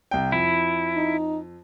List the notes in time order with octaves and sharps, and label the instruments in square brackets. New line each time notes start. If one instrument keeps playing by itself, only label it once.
[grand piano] C2 G5
[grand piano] F2 [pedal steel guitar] E4
[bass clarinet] D#4